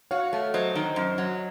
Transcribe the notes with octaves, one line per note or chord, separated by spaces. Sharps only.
F#4 C#5 F5
A3
F#3 C5 D#5
D#3
F#2
F#3